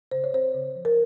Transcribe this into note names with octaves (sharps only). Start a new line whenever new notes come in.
C#3 C5
C#5
C4 C5
C#3
F3
A#4